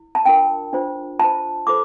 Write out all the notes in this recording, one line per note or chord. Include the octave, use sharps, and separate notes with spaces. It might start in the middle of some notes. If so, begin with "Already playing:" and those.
Already playing: E4
A5
D4 F4 A#4 G5
D4 F4 C5
F4 C5 A5
F4 A4 C5 D6